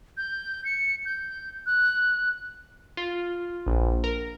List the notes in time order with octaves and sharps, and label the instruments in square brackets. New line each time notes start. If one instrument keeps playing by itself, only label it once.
[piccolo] G6
C#7
G6
F#6
[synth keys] F4
A#1
A#4